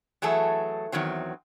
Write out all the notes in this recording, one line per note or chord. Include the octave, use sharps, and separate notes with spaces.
E3 F#3 A3 G#4 A4
E2 D#3 F#3 C4